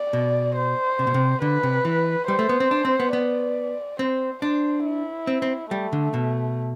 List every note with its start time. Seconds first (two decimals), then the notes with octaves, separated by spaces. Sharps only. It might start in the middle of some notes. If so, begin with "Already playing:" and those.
Already playing: D5
0.13 B2
0.56 C5
0.99 C3
1.07 B2
1.14 C3
1.42 D3 B4
1.63 C3
1.85 E3
2.28 G3 C5
2.39 A3
2.49 B3
2.60 C4
2.71 D4
2.85 C4
3.00 B3
3.13 B3 D5
3.99 C4 C5
4.42 D4 C5
4.85 E4
5.27 C4
5.42 C4
5.71 G3 A3
5.93 D3
6.14 B2